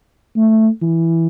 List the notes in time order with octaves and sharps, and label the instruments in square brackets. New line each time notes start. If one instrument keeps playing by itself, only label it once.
[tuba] A3
E3